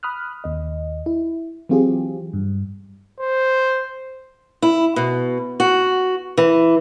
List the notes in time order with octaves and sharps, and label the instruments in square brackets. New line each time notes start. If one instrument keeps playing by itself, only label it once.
[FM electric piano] B5 D#6 F6 F#6
D#2 D#5
E4
E3 F#3 C4 F4 G4 G#4
G2
[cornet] C5
[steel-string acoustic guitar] E4
B2
F#4
E3